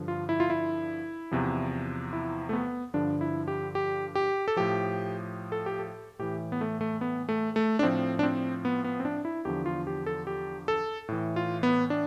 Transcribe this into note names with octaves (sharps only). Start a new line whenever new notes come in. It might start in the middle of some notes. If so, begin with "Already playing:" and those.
Already playing: G2 D3 F3
F4
E4
F4
E4
E2 C3 F3
E4
A3
B3
G2 D3 F3 D4
E4
G4
G4
G4
A4
A2 F3 G4
A4
G4
A4
A2 E3 G4
B3
A3
A3
B3
A3
A3
D4
A2 F3 C4
D4
C4
B3
B3
C4
D4
E4
E2 D3 F3 G4
F4
G4
A4
G4
A4
A2 E3
F4
B3
D4